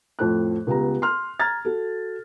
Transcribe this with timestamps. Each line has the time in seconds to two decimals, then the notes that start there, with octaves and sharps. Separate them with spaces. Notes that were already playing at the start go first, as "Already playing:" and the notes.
0.19 F2 A2 A4 F#6
0.67 C#2 G3 B3 A#5
1.02 C6 F6
1.40 A#5 F6 G#6 A6
1.65 F#4 A4